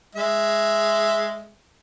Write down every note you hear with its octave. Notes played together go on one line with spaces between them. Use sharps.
G#3 E5